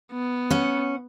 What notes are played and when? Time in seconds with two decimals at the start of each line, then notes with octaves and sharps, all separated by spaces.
0.12 B3
0.51 C#4 F#5